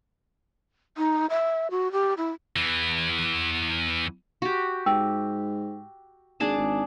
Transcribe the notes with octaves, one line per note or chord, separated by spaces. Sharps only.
D#4
E5
F#4
G4
E4
E2 E3
F#4 G4
G#2 G5 E6
G#1 D4 G#4 A5
G#1